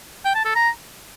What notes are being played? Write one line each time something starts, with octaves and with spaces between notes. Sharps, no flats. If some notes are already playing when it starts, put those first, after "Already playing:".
G5
A5
A4
A#5